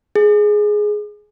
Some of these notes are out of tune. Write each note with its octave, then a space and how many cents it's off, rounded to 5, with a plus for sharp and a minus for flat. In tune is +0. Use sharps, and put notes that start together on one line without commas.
G#4 +10